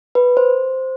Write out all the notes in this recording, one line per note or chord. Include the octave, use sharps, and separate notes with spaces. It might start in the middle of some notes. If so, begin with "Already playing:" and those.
B4
C5